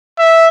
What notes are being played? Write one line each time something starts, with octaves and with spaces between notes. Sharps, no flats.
E5